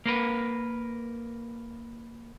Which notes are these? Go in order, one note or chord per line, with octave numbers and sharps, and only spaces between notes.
A#3 A#4 B4